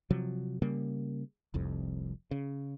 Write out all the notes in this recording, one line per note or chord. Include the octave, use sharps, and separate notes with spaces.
C3 F3 F#3
C#3 G3 A#3
F1 C2 F2
C#3